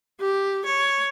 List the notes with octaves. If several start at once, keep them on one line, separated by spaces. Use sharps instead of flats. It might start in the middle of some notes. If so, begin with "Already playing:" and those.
G4
C#5